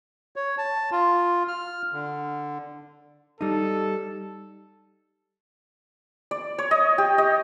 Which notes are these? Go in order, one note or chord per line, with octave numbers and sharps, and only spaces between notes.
C#5
A5
F4
F6
D3
G3 D#4 A4
D5
C#5
D#5
G4
D#5